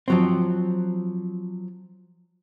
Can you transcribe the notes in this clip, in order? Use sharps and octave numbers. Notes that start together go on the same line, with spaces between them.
F3 F#3 C4